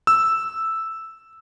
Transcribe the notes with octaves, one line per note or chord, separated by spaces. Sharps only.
E6